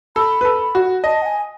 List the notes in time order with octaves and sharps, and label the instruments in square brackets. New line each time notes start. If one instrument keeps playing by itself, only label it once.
[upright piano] A4 [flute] B5
[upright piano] B4
A4
F#4
[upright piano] D#5 [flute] A5
[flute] F#5
G#5